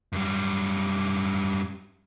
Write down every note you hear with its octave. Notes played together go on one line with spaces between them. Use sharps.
F#2 G3